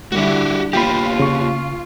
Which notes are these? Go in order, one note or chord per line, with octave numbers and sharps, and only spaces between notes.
D3 G3 E4 F#4 G4
A#3 B3 F4 G4 G5 B5
C#3 C#6